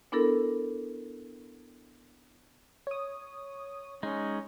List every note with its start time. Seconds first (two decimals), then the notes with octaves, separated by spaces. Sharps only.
0.12 B3 D4 E4 A4 A#4
2.87 C#5 D#6
4.03 G#3 C#4 D#4